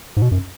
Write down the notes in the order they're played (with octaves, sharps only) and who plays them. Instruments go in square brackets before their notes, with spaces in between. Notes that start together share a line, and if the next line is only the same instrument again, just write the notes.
[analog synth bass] G#2
B2
F#2